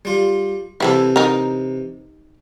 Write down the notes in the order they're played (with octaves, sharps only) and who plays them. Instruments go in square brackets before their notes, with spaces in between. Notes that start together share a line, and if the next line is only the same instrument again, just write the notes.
[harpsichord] G3 F4
[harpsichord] C3 E3 [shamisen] E4 G#4 A4
[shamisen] D#4 A#4